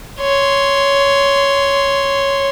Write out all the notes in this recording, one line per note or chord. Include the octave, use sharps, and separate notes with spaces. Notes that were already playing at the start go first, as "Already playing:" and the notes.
C#5 C6